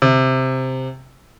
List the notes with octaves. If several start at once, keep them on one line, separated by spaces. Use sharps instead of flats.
C3